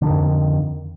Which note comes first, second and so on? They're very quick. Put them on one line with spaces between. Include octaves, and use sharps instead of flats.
D3 D#3 F2